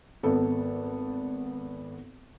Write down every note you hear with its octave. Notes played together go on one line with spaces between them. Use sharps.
G#1 B3 A4